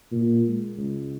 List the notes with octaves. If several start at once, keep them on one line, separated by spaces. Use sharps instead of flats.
A#2
G#3
C#2